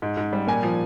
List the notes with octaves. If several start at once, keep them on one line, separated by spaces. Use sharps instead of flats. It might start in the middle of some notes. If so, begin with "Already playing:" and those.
G#2
G#2
G3
A#2 G#5
F3